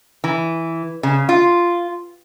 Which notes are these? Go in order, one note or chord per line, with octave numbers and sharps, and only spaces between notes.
E3
C#3
F4